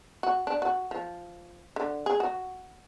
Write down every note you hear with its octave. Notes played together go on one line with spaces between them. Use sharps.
F#4
D4
F#4
F3
D3
G#4
F#4